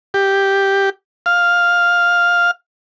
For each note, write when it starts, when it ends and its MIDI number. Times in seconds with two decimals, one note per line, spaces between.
0.14 0.90 67
1.26 2.51 77